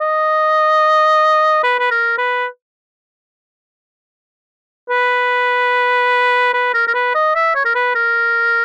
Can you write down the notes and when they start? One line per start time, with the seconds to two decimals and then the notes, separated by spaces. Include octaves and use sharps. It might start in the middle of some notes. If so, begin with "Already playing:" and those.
0.01 D#5
1.64 B4
1.80 B4
1.91 A#4
2.18 B4
4.90 B4
6.54 B4
6.74 A#4
6.87 A#4
6.94 B4
7.15 D#5
7.35 E5
7.55 C#5
7.65 A#4
7.75 B4
7.95 A#4